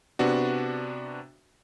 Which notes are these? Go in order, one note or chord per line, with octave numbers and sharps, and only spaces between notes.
C3 B3 D4 F#4